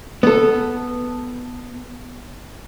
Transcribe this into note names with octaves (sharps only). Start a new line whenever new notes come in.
B3 A4